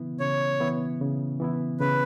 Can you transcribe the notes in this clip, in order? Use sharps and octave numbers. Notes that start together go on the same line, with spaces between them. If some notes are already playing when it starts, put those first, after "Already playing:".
Already playing: C#3 E3 B3 E4
C#3 C#5
E3 B3 E4
C#3
E3 B3 E4
C#3 B4